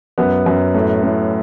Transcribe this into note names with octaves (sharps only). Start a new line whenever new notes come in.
F#2 B3
F#2
A2
A2